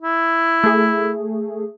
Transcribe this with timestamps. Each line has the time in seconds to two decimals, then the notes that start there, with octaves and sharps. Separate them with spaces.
0.02 E4
0.64 A3 G#4